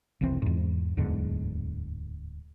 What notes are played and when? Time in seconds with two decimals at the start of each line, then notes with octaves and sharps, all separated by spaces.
0.21 F1 C2 E3 C4
0.42 E2 G#2
0.97 D1 E2 G#2 D3